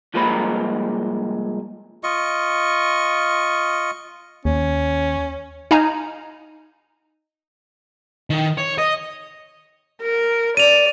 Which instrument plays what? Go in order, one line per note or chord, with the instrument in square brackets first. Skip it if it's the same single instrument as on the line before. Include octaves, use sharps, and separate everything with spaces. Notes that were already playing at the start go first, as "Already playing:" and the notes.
[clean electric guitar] C2 F3 G#3 A#3 C5 B5
[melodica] F4 D#5 C#6
[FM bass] D#2 [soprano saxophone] C#4
[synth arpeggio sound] D#4 F5 G#5 A#5
[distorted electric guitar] D#3
C#5
D#5
[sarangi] A#4
[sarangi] D5 [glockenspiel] D#7 F7